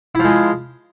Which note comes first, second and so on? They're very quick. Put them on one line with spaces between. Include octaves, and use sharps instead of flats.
E4 F3 G#3